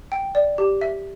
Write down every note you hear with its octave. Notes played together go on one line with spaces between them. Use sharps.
G5
D5
G4
E5